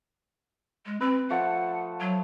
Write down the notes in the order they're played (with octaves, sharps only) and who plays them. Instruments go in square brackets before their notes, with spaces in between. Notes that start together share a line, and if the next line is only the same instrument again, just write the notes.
[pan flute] G#3
[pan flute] C4 [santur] B4
[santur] F3 A3 A5 [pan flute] F#5
[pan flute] F#3